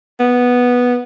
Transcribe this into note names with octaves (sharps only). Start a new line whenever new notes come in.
B3